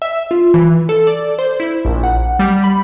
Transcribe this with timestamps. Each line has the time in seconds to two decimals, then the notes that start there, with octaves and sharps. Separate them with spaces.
0.02 E5
0.31 F4
0.54 E3
0.89 A4
1.07 D5
1.39 C5
1.60 E4
1.85 A#1
2.03 F#5
2.39 G3
2.64 B5